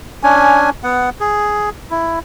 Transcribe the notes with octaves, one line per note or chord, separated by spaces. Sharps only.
C#4 D4 G#5
B3 F#5
G#4
E4